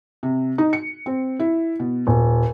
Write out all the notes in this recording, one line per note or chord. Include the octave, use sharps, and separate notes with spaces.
C3
D#4
C#7
C4
E4
B2
D#1